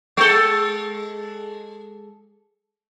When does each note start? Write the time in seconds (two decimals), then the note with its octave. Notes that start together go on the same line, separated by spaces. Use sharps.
0.17 G#3 A4